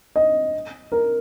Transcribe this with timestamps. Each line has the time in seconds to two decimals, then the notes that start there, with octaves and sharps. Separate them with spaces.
0.16 D#5
0.92 A#4